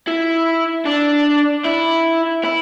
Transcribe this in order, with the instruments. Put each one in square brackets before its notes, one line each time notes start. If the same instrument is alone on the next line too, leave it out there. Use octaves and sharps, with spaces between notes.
[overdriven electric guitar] E4
D4
E4
E4